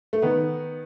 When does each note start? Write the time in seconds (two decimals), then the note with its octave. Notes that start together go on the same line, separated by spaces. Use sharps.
0.13 A3
0.22 D#3 B3